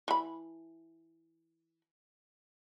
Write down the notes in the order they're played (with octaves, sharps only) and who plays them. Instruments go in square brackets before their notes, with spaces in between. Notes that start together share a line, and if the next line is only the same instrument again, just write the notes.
[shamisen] E3 B5